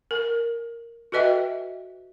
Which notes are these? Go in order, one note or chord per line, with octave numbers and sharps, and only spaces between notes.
A#4
F#4 A4 B4 D#5 E5 G5